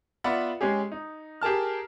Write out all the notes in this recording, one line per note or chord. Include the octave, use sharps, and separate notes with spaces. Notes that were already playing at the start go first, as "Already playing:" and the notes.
B3 F4 D5 E5 F#5 B5
G#3 C#4 G4 G#4
D#4
G4 G#4 A#4 A5 F6